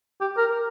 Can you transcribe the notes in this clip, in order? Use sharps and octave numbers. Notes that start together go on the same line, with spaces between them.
G4
A#4